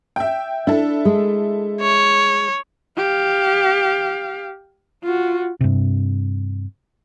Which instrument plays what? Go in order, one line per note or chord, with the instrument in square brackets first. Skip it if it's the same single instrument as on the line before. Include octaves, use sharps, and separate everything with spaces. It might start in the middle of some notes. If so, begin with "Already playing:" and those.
[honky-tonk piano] E5 G5
[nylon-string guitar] D4 [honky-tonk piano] E4 A4
[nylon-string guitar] G#3
[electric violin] C#5
[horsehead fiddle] G4 F5
F4 F#4
[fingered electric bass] G2 C3